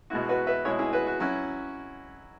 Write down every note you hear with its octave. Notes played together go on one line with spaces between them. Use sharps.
B2 G#3 E4 F#4
F#4 B4
B4 E5
B2 G#3 E4 G#4 C#5
E4 G#4
F#4 B4
F#4
F#3 C#4 E4 F#4